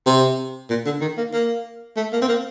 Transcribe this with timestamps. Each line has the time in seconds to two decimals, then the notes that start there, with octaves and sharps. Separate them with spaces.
0.06 C3
0.70 A#2
0.86 D3
1.01 D#3
1.18 A#3
1.33 A#3
1.97 A3
2.12 A#3
2.22 C4
2.28 A#3